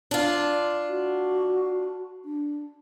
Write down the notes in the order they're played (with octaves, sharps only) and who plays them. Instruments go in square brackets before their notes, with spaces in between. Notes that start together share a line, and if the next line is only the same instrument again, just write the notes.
[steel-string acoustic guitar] D4 F4
[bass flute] F#4
D4